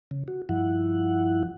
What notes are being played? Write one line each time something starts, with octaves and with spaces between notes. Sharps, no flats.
C#3
F#4
G2 F3 E4 F#5